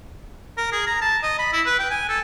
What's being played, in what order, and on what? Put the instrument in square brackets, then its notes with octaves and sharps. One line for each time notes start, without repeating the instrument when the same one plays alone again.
[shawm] A#4
G#4
A#5
A5
D#5
B5
E4
B4
G5
G#5
A4